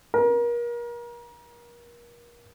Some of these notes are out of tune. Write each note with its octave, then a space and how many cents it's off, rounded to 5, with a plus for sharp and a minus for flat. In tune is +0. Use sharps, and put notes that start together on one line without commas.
A#4 +35